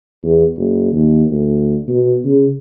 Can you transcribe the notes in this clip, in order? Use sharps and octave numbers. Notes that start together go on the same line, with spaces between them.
E2
F#1
D#2
D2
B2
C#3